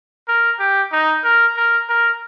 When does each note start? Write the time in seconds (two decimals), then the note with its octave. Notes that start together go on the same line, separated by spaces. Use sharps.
0.28 A#4
0.59 G4
0.92 D#4
1.24 A#4
1.56 A#4
1.89 A#4